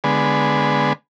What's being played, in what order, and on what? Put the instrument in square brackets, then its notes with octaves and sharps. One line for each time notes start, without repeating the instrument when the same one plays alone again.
[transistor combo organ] D3 G#3 B3